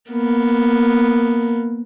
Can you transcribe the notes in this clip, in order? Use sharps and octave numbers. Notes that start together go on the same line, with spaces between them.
A#3 B3